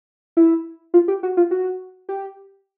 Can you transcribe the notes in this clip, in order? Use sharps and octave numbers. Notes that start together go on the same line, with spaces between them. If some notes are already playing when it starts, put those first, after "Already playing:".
E4
F4
G4
F#4
F4
F#4
G4